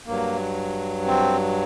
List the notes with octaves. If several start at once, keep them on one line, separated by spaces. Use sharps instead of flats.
G2 F#3 A#3
C4